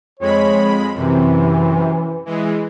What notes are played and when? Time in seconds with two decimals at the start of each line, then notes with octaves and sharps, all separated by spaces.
0.20 F2 G#3 C#5 B5
0.94 F#2 C3 E3
2.26 E3 G#3